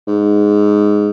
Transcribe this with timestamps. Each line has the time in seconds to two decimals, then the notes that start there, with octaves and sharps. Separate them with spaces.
0.07 G#2